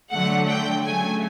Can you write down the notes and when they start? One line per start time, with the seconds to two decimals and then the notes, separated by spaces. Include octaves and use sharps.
0.11 D3 F#3 A3 F#5
0.49 G5
0.85 C#3 F#3 A3 G#5